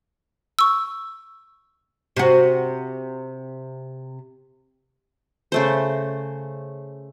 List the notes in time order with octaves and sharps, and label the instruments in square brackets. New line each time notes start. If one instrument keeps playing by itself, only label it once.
[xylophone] C#6 E6
[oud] C3 F#4
[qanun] C#3 A3 C5